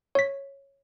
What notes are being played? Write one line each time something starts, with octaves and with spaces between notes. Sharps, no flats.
C#5 B6